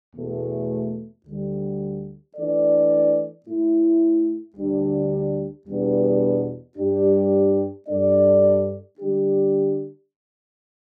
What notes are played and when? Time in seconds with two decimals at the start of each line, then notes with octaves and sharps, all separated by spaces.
0.14 E2 B2 A3
1.26 D2 D3 G3
2.36 E3 A3 D4 A4 D5
3.46 A2 A3 E4
4.56 D2 D3 G3 D4
5.67 E2 B2 G3 B3 D4
6.77 G2 G3 D4 G4
7.87 G2 G3 D4 A4 D5
8.99 D3 G3 D4 G4